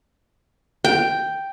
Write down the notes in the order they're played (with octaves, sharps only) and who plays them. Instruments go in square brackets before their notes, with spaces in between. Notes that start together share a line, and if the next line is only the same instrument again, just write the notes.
[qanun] G5